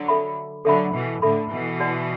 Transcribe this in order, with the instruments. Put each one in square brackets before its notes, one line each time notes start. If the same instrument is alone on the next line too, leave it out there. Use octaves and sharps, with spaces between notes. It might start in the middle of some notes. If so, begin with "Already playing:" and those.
Already playing: [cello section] D3 F#3
[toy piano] A4 E5 B5
[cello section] D3 F#3 [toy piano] A4 E5 B5
[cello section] B2 E3
[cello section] A2 D3 [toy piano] A4 E5 B5
[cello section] B2 E3
[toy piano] F#4 D5 F#5 A5